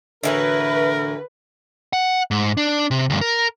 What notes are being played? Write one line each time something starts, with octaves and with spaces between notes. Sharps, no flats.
A2 D3 E3 F#4 A#4 B4
F#5
G#2
D4
C3
D2 G2
A#4